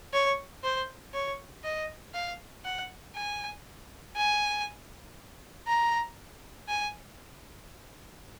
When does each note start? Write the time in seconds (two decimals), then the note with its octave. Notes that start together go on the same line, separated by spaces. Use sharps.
0.13 C#5
0.63 C5
1.14 C#5
1.64 D#5
2.14 F5
2.65 F#5
3.15 G#5
4.16 G#5
5.67 A#5
6.68 G#5